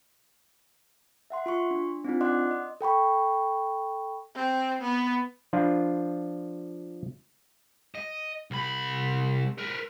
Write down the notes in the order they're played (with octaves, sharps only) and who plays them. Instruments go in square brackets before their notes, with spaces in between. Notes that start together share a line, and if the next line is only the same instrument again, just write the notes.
[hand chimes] E5 F#5 C6
F4 C6 C#6
D4
C4 D4 D#4 F4
D5 D#5 F#5 C6 D6 F#6
D#5
A4 G5 B5 C#6
[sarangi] C4
B3
[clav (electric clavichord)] F3 D4 F4
[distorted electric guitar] D#5
C2 B5
A#4 B4